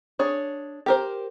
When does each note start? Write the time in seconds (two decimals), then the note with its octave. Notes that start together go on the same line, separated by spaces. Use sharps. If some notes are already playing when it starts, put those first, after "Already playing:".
0.19 D4 G#4 C#5
0.86 G4 A#4 C5